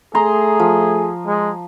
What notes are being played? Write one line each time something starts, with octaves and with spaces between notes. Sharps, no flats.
A3 G#4 A#5 C6 D#6
F3
G#3